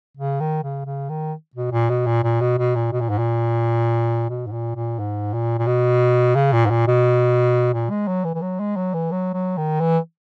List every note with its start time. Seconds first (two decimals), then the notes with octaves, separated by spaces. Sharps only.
0.17 C#3
0.40 D#3
0.63 C#3
0.86 C#3
1.09 D#3
1.56 B2
1.72 A#2
1.90 B2
2.06 A#2
2.24 A#2
2.41 B2
2.58 B2
2.76 A#2
2.92 B2
3.01 A#2
3.09 G#2
3.19 A#2
4.29 B2
4.47 G#2
4.53 A#2
4.75 A#2
4.99 G#2
5.34 A#2
5.59 A#2
5.67 B2
6.36 C#3
6.53 A#2
6.66 G#2
6.71 A#2
6.88 B2
7.74 A#2
7.90 G#3
8.08 F#3
8.25 E3
8.35 E3
8.42 F#3
8.60 G#3
8.77 F#3
8.94 E3
9.12 F#3
9.34 F#3
9.57 D#3
9.80 E3